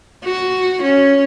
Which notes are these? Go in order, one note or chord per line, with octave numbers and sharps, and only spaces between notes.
F#4
C#4